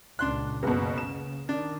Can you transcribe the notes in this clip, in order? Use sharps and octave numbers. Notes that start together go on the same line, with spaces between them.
C#2 A#2 D4 C6 F#6
F#1 B2 B3
C#3 E7
D#3 D4